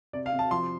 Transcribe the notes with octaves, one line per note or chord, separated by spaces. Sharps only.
C3 D5
F5
C3
A5
F3 C6